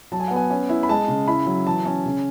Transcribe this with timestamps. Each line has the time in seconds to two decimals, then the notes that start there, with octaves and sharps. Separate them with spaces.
0.12 F#3 A5
0.20 G#5
0.28 B3 F#5
0.36 G#5
0.51 C#4
0.69 E4
0.83 B5
0.89 G#3 A5
1.08 C#3
1.27 E4 B5
1.46 F#3
1.67 E3 A5
1.86 C#4
2.05 C#3